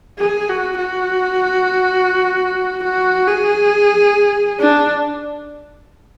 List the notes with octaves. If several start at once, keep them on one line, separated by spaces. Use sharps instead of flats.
G#4
F#4
F#4
F#4
G#4
D4